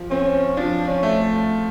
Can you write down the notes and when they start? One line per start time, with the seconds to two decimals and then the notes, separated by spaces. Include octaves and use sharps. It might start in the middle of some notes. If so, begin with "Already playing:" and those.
Already playing: F3
0.11 C4 C#4
0.57 F3 D4
0.88 C#4
1.03 A3